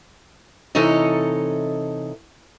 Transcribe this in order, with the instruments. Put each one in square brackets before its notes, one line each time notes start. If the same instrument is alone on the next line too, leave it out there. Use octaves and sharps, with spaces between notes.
[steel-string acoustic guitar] C3 E3 D#4 A4 C#5 D#5